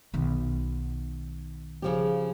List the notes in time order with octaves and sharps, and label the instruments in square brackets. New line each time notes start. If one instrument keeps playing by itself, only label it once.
[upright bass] B1 D#3
[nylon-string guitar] C#3 F3 G4